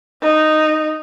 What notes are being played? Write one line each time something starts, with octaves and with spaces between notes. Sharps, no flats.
D#4